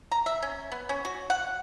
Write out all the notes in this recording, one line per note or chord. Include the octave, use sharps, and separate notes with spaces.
A#5
E5
C#4
B3
C#4
F#4
F#5